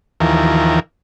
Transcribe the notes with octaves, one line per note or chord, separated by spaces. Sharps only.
D#2 E3 F3 A#4